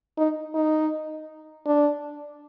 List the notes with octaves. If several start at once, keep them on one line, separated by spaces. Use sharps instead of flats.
D#4
D#4
D4